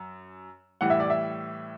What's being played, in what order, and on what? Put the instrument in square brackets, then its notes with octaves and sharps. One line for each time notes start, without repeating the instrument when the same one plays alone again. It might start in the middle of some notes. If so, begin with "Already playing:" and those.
Already playing: [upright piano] F#2
A2 E3 G3 F#5
E5
D5
E5